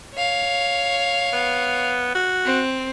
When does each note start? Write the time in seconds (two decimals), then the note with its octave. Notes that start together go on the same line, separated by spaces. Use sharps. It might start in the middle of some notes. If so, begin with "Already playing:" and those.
0.15 C#5 F5
1.33 B3
2.15 F#4
2.45 C4